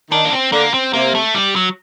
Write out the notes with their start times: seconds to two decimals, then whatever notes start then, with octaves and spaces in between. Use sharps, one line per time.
0.11 D#3 D4
0.25 A#3
0.32 C4
0.52 D3 A#3
0.74 C4
0.93 C3 A#3
1.15 A3
1.35 G3
1.56 F#3